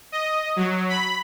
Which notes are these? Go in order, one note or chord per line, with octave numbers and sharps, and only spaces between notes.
D#5
F#3
B5